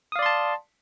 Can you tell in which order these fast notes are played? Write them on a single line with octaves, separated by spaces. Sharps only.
D#6 F5 D5 C6 A5